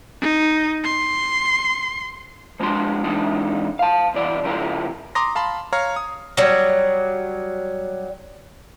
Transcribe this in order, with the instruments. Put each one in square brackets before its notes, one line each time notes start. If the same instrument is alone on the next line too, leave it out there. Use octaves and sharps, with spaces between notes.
[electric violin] D#4
C6
[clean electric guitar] F3 G#3 D4 F#4 C6
E3 G#3 D4 D#4
F5 A5
B2 E3 D5
C#3 F3 E4 G4 A#4
[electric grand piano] A#5 C6 D6 D#6 A#6
F5 A5 B5 C6
C#5 F5 A#5 F6
D#6
[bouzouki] F#3 G3